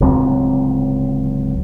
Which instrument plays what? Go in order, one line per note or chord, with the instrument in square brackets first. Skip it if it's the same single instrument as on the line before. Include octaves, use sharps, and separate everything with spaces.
[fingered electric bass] D1 C#2 F#3 C4